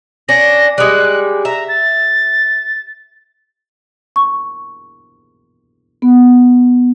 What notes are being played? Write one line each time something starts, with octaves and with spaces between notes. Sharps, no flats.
C#4 D4 A#6
G3 G#3 F#6
E5 A#5
A6
C#6
B3